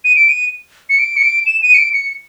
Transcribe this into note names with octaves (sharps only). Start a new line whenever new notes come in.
D#7
D7
D#7
C#7
D7
C#7
D7
E7
D#7
C#7
D7
C#7